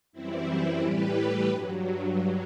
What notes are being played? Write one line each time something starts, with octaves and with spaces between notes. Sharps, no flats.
F#2 E3 G3 C4 E4
A2 E3 G3 G4 B4
G2 F#3